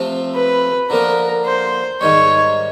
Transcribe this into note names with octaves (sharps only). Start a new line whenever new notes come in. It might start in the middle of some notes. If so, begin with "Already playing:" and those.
Already playing: C3 F3 A3 C4 F4
B4
D3 F3 A#3 A#4
C5
G#2 D#3 G3 C#5